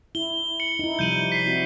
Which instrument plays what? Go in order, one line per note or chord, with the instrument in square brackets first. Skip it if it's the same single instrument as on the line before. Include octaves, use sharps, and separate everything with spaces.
[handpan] E4 [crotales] G7
[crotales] C#7 F#7
[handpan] D#4 E4
[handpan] C3 F3 G3 [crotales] G6 D#7 F#7
[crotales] B6 C7
[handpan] C4 E4 F#4